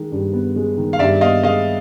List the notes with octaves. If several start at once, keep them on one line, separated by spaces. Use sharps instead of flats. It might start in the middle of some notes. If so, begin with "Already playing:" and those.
Already playing: D#3 G#3
G2
B3
G#3
D#3
F5
G2 D5 E5
B3 D#5 F5
G#3 D#5 F5